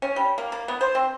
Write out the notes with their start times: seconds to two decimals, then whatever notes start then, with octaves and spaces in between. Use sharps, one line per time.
0.02 C#4
0.16 G3
0.38 A#3
0.52 A#3
0.68 B3
0.81 C5
0.95 C4